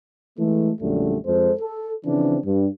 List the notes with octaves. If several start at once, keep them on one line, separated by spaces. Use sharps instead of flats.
E3 G#3 A3
A#1 F#2 D3 G3 A3
F2 G#3 A4 C5
A4
C#3 E3 F3 C4 D4
G2